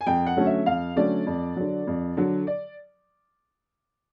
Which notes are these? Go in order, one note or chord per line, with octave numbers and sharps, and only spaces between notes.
G#5
F2 G5
F#5
D3 F#3 A3 C#4
E5
F2 F5
D3 F#3 A3 C#4 D5
F2
D3 F#3
F2
D3 F#3
D5